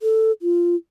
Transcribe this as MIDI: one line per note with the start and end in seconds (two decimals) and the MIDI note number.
0.02 0.32 69
0.42 0.75 65